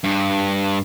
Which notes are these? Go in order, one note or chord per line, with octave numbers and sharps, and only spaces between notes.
G2